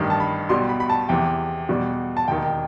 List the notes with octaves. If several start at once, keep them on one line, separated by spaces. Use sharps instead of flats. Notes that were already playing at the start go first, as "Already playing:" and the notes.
Already playing: A1 G2 D#3
A5
B5
B1 B2 G3 C6
B5
B5
A5
E2 C3 E3 G5
E2 B2 G3
A5
E1 D#2 D#3 G5